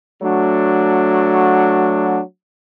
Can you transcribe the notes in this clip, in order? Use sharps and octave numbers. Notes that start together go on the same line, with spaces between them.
F#3 A3 D4 F#4